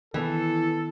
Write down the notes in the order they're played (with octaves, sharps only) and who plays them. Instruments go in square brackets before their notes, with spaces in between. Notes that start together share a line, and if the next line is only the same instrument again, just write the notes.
[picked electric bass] D#3 B3 [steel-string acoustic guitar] E3 [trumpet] A4